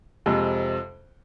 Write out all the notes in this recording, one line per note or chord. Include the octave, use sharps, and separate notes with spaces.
F2 C3 G#3